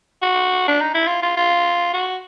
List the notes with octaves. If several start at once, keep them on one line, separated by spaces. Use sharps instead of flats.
F#4
D4
D#4
E4
F4
F4
F4
F#4